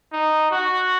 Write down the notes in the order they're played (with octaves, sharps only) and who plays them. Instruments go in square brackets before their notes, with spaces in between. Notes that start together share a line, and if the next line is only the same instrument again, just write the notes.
[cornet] D#4
F#4